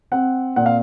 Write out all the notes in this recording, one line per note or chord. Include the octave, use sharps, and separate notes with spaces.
C4 F#5
A#2 F#5
F5